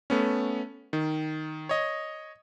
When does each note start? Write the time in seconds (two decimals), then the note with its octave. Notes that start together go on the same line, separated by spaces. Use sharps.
0.10 A3 B3 C#4
0.93 D#3
1.69 C#5 D#5